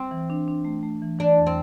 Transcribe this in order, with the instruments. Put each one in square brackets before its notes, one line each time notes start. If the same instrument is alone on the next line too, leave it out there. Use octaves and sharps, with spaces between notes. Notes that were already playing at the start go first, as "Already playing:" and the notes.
Already playing: [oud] C4
[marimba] E3
D4
D4
A3
A3
E3
[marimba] E3 [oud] D4
[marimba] E2
[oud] C4